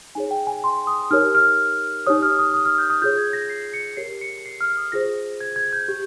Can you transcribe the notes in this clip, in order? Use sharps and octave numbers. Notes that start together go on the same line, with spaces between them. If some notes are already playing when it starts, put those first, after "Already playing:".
D#4 G#4 C#5 G#5
G5
G#5
C6
D#6
D#4 G4 A#4 C#5 F6
F6
D#4 G4 C#5 D#6
F6
D#6
D#6
F6
G6
D#6
F4 G#4 C#5 G6
G#6
A#6
C7
C#7
G4 A#4 C#5 C7
C#7
C7
F6
D#6
F4 G#4 C5 A#6
G#6
G#6
G6
G4